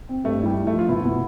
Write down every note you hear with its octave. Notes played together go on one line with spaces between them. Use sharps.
C4
G2 A3
G3 E4
E4
A3
F3
F4
B2 E4
B2